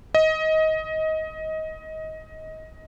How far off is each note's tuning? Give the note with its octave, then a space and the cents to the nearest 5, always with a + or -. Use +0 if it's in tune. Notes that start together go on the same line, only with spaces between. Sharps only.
D#5 +20